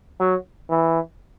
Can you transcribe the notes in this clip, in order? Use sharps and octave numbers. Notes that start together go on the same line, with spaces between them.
F#3
E3